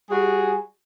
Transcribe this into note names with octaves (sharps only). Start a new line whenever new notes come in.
G3 F#4 G#4